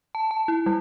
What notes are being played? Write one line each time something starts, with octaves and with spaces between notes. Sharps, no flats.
A5
A5
E4
G3